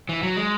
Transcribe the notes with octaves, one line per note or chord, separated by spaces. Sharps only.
E3
F#3
G#3